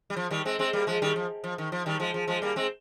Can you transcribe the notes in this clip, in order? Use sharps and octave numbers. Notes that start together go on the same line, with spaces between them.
G3
F3
D#3 G3
G#3 C4
G#3 C4
G3 A#3
F3 G#3
D#3 G3
F3
F3
D#3
F3
D#3 G3
F3 G#3
F3
F3 G#3
G3 A#3
G#3 C4